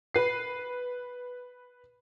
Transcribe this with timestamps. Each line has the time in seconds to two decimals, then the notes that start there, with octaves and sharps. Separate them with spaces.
0.14 B4 C7